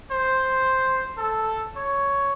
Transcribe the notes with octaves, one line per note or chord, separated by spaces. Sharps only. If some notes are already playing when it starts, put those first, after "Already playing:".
C5
A4
C#5